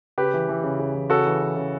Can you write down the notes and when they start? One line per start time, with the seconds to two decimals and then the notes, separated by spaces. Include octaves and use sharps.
0.18 C#3 G4 B4
0.34 E3
0.49 E3
0.64 C#3
0.79 C#3
0.94 E3
1.10 C#3 F#4 A4
1.26 E3
1.41 E3
1.56 C#3